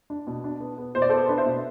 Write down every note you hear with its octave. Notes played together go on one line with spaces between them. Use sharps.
D4
B2
D4
B3
B3
B2 C5
D5
B3 A4 C5
D4 B4 D5
C5 E5
B2